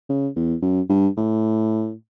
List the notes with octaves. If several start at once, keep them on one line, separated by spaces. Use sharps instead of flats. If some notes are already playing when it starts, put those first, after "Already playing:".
C#3
E2
F#2
G2
A2